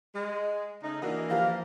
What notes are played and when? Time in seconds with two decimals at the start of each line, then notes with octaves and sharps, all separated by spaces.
0.15 G#3
0.83 C#3 A3 D#4
1.02 E3 A#3 D4 F#4 D#5
1.30 F3 G4 A#4 F5